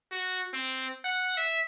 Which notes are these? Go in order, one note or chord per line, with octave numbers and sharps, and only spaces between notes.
F#4
C4
F#5
E5